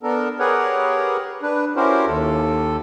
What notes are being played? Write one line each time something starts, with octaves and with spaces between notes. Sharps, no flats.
B3 D4 A4 A#4
G4 G#4 A#4 B4 C#5 F#5
D4 B4
C#4 E4 F#4 G4 A#4 C5
D#2 A4